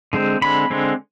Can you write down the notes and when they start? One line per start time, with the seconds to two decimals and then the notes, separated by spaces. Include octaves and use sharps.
0.13 D3 G#3 C4
0.42 D3 G#3 C4 B5
0.70 D3 G#3 C4